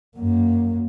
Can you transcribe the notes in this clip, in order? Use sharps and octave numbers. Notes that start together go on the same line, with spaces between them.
F#2 A#3